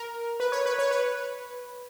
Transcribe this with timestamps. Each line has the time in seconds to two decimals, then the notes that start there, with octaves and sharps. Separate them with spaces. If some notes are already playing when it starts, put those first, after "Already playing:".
Already playing: A#4
0.40 B4
0.52 C#5
0.66 B4
0.79 C#5
0.91 B4